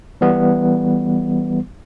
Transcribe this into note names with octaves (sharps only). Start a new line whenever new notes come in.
E3 G3 B3